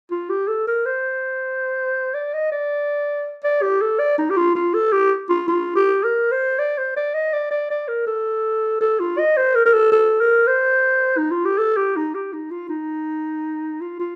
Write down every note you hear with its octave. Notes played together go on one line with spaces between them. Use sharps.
F4
G4
A4
A#4
C5
D5
D#5
D5
D5
G4
A4
D5
D#4
G4
F4
F4
A4
G4
F4
F4
G4
A#4
C5
D5
C5
D5
D#5
D5
D5
D5
A#4
A4
A4
F4
D#5
C5
A#4
A#4
A4
A4
A#4
C5
D#4
F4
G4
A4
G4
D#4
G4
D#4
F4
D#4
F4
F4